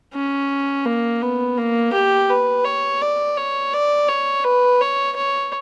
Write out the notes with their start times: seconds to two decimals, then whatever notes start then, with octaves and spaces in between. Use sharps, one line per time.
0.14 C#4
0.86 A#3
1.22 B3
1.58 A#3
1.93 G4
2.30 B4
2.65 C#5
3.02 D5
3.38 C#5
3.73 D5
4.09 C#5
4.45 B4
4.81 C#5
5.16 C#5